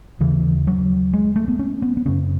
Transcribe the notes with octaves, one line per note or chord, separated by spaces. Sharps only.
D#2 C#3 E3
F#3
G#3
A3
B3
C#4
B3
B3
F#2 C#3 C#4